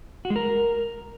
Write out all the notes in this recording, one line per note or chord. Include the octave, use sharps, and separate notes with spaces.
F#4
G#3
A#4